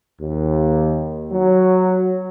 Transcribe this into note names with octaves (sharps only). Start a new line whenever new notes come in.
D#2
F#3